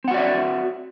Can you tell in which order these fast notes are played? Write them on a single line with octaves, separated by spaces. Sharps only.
C4 F#5 F#4 D5 E5